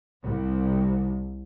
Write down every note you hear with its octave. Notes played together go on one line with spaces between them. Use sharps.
C2